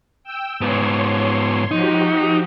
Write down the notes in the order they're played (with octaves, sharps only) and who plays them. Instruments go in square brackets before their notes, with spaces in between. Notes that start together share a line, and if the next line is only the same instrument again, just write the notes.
[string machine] G5 E6
[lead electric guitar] G#2 B3 [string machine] C#5 C6
[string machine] F3 F#4 G4 [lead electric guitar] D#4